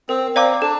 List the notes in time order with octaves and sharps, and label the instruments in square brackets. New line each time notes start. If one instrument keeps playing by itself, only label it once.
[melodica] C4 [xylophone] A#4
[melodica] C4 [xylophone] D5 F5 A#5 D6
[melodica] D4 [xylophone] A4